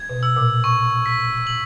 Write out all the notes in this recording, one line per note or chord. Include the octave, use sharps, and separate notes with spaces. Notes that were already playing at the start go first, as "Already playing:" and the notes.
Already playing: G#6
B2
E6
A#2
C#6
B6
F#7